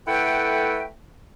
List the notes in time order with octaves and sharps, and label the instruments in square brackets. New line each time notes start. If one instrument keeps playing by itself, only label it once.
[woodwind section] A3 E4 A4 B4 F#5 G5